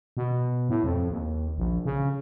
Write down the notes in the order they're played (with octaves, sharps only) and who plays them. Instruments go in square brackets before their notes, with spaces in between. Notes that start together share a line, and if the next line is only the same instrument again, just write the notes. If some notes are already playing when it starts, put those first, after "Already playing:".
[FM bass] B2
A2
F2
D#2
A#1
C#3